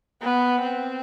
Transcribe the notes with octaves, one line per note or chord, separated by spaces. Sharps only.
B3
C4